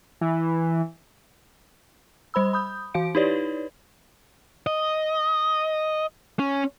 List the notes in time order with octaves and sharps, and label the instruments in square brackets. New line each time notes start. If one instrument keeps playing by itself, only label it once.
[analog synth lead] E3
[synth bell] G3 C5 B5 E6
B5 D#6 G6
E3 F#4 F5 D7
D#4 E4 G4 B4 C#5 D5
[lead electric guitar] D#5
C#4